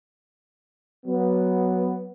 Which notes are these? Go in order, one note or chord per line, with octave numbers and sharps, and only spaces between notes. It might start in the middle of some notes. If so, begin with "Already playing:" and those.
F#3 B3